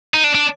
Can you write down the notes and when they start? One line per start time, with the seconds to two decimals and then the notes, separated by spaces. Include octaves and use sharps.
0.14 D#4
0.24 D4
0.35 D4